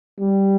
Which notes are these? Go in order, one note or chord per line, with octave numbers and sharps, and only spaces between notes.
G3